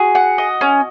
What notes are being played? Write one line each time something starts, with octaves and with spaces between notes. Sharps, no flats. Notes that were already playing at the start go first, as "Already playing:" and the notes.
Already playing: F#4 G#4
F#5
D#5
C#4